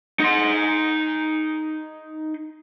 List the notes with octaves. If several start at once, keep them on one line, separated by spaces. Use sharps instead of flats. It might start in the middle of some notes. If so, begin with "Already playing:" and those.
D#4 C6